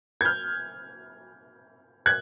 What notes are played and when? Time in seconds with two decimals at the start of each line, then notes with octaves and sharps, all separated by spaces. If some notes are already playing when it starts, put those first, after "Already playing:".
0.21 G#6
0.25 F6 G6
2.06 F#6 G#6